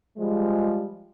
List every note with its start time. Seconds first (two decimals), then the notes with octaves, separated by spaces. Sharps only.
0.17 F3 G3 G#3